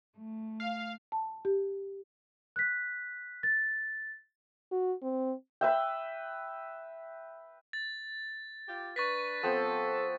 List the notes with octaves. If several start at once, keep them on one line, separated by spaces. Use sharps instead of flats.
A3
F5
A5
G4
F#6 B6
A6
F#4
C4
B4 E5 G5
A6
F4 G4
D4 B4 C#6 A6 B6
F3 B3 C4 A4